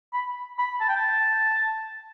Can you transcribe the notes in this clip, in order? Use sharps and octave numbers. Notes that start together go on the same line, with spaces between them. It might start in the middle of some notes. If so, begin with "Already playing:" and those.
B5
B5
A5
G5
A5